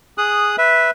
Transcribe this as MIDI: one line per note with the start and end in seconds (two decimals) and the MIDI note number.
0.18 0.56 68
0.18 0.56 87
0.18 0.56 90
0.58 0.91 71
0.58 0.91 76